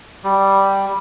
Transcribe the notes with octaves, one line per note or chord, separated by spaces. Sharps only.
G3